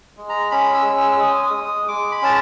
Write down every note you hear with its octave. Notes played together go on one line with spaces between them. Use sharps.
G#3
A#5
C#4 B5
E6
G#3
E6
E6
G#3 D#6
D#6
G#3
D#6
G#3 D6
B5
C#4 A5